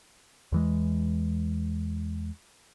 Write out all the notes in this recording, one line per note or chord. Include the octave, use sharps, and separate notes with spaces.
E2 E3 G#3